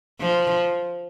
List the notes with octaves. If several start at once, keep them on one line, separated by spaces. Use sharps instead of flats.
F3